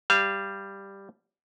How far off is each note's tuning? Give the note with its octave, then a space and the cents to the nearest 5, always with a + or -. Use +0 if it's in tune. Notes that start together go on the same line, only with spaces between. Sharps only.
G3 +5 F5 -20